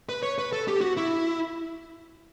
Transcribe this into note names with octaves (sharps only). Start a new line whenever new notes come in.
B4
C#5
B4
A4
G4
F#4
E4